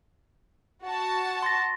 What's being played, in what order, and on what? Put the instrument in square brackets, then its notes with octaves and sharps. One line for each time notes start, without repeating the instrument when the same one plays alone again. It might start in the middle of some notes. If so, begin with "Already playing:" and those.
[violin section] F#4 A5
[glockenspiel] C6 A6 A#6